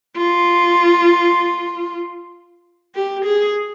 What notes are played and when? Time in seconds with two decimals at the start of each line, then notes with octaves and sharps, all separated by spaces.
0.17 F4
2.95 G4
3.25 G#4